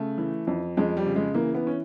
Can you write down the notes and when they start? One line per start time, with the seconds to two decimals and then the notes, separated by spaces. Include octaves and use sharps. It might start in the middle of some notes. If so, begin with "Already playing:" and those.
Already playing: C#3 A3
0.18 E3
0.47 F2
0.77 F2 G#3
0.97 G3
1.06 C#3
1.16 G#3
1.35 E3 A#3
1.54 B3
1.67 C#4